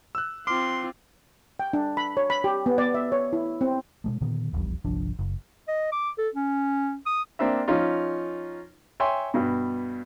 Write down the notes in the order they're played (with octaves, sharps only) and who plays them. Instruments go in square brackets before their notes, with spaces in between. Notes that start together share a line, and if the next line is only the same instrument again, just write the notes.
[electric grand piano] E6 F#6
[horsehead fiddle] C4 F4 [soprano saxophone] C6 [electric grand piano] D6 F6
[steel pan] G5
D4
B5
C#5
B5
G4
B3
D5
E5
C#5
E4
C4
[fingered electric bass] B2 G#3 A3
A#2 D3 D#3 B3
D#1 A#1 E2 G3
G1 C2 F3 D4
F#1
[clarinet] D#5
D6
A4
C#4
D#6
[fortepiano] A#3 C4 D4 E5
F3 C#4 D#4 F4
C#5 E5 G5 G#5 C6
G2 B2